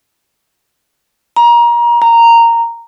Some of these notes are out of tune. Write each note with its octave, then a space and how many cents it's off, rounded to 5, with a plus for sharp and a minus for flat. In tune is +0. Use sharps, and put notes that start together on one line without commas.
A#5 +25
A#5 -10